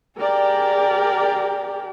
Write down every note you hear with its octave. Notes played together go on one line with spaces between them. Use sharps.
G4 G#4 A#4 D5